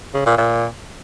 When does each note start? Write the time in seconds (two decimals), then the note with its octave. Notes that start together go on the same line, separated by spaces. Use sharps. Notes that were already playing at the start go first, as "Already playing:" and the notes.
0.14 C#3
0.26 A#2
0.37 A#2